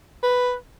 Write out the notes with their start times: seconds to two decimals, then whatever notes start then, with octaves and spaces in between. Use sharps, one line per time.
0.23 B4